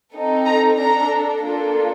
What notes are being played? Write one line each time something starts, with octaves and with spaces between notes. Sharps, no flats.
C4 D#4 A4
A#5
D4 A4 A#5
A#3 D4 F4 A4